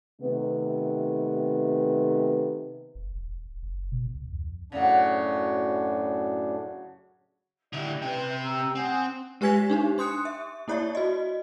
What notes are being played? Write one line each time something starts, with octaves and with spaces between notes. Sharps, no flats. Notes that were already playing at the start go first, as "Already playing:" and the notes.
C3 D#3 A3 B3
F#1
E1
F#1
B2
C#2
F2
F#2 A2 C#3 F#3 D4
D3 E4 G4 D5
C3 B4 G5
G4 A#5 E6
C4 F#5 G#5 D#6
G#3 G4 B4 G#5 G#6 B6
D4 D#4 G4
D4 C6 D#6 F#6 C#7
E5
A#3 E4 C#5 D5 E5
F#4 D#5